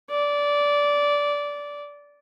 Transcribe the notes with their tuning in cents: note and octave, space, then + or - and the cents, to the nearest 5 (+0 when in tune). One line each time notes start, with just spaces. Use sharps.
D5 -15